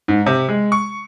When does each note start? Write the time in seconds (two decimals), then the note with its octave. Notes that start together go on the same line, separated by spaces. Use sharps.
0.08 G#2
0.26 C3
0.49 G#3
0.72 C#6